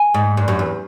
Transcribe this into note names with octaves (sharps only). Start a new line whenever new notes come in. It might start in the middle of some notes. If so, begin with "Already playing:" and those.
Already playing: G#5
G#2
G2
F#2
E2